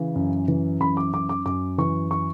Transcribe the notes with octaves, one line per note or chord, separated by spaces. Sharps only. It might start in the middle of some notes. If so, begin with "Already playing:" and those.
Already playing: C#3 E3
F#2
E3
F#2 B5
D6
F#2 D6
D6
F#2 D6
E3 C#6
C#6